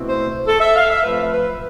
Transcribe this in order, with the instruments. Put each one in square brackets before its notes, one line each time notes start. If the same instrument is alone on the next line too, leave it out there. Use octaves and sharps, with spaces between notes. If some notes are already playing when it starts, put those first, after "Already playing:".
Already playing: [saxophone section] B2 A3 C4 E4
C5
A4
E5
F5
E5
F3 A3 C4 B4
B4